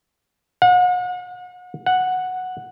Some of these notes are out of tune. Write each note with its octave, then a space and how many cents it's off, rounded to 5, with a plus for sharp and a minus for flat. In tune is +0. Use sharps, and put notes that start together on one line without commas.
F#5 -40
F#5 -5